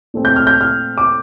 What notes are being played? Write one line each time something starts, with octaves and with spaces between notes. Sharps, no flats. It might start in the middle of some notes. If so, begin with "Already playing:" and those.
A#2 A3 C4
G6
F6
G6
F6
D6